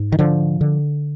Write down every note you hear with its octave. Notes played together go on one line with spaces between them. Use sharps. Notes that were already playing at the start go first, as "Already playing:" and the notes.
Already playing: G#2
D#3
D3 F3
D3